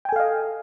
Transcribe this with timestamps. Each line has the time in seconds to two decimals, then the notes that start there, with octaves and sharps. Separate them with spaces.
0.05 G5
0.09 G#5
0.12 A4
0.16 F5
0.20 D#5